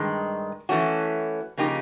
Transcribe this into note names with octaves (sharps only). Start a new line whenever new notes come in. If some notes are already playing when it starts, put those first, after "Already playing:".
Already playing: G2 D#3 G#3
E3 A3 C#4 F#4
C#3 F3 A#3 D#4 G4